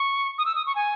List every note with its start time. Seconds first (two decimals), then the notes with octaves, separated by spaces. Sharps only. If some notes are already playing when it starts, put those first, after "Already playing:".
Already playing: C#6
0.38 D#6
0.46 E6
0.55 D#6
0.67 C#6
0.76 G#5